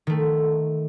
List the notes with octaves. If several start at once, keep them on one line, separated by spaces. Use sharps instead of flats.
D#3 A3